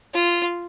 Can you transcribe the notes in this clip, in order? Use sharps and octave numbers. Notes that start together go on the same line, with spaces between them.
F4